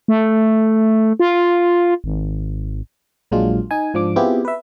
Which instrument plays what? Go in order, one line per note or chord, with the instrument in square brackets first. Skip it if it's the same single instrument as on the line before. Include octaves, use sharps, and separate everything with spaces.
[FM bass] A3
F4
G#1
[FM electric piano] A#1 A#2 F#3 G#3 D4 F4
D#4 G#5
G#2 F3 D4 D6
B3 C4 E4 F4 G4 G#4
B4 E5